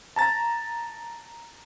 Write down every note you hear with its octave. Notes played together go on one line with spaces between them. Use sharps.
A5 A#5 A6